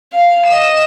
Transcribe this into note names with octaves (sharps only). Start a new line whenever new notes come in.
F5
D#5 E7